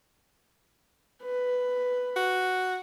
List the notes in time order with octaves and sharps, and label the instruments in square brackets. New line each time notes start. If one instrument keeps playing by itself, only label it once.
[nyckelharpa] B4
[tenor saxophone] F#4